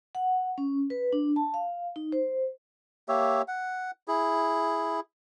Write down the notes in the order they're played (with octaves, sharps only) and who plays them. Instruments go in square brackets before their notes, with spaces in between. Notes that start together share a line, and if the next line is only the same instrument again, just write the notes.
[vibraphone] F#5
C#4
B4
D4
A5
F5
D#4
C5
[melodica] A#3 G4 C#5 E5
F#5
E4 G#4